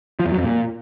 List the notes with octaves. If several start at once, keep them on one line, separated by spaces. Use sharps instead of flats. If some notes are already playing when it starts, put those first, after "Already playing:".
F3
E2
F#3
F2
A#2